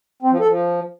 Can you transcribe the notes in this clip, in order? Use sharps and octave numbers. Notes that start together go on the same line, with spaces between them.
C4
F3
A4
F3